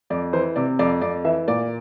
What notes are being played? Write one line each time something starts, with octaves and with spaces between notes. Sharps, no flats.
F2 D5
E3 C5
C3 D5
F2 D5
F2 D5
E3 E5
A#2 D5